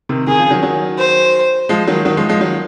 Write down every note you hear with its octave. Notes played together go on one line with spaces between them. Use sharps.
C3 D#3
C3 D#3 G#4
C#3 F3
D#3 F#3
D#3 F#3
C5
F3 G#3
D#3 F#3
D#3 F#3
F3 G#3
F3 G#3
D#3 F#3